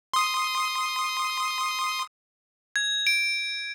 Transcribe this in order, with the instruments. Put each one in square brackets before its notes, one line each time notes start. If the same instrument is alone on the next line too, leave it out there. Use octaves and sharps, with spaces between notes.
[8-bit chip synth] C6 D#6
[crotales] G#6
D7